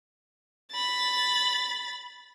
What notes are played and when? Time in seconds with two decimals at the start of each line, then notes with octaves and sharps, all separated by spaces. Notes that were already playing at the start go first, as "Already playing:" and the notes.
0.72 B5 A6